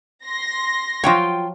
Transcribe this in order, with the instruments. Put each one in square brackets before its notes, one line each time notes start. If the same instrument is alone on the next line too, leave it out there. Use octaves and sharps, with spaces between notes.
[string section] C6 A#6
[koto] F3 F#3 C#5 [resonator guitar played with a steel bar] F4 G5